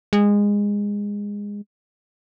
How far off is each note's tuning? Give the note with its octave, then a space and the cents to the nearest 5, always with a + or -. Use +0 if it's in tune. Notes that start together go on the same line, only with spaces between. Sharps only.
G#3 -20